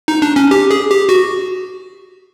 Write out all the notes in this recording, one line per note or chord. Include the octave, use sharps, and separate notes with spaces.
D#4
D4
C#4
G4
G#4
G4
F#4